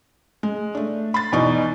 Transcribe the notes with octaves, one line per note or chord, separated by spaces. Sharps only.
G#3
A3 D4
B5 C6 A6
E2 B2 D#4 D5